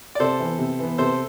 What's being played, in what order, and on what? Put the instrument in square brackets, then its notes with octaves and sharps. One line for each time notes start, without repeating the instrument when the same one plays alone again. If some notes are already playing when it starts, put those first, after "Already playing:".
[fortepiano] D5
[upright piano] C3 [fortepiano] A4 C5
[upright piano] E3 B3
C3
E3 B3
[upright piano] C3 [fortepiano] A4 C5